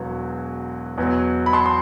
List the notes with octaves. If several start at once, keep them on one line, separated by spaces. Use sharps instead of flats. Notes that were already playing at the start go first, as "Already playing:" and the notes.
Already playing: E1 E2 F#3
E2 B2 F#3
B5
A5 C6
C6